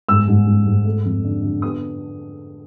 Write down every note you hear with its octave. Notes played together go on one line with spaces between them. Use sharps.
G#2 E6
G#2
G#2
G#2
A3
F2
D3
D3
B3 D#6